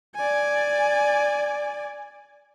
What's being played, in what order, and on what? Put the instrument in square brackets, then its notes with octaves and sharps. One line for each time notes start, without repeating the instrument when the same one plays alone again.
[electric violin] D5 G#5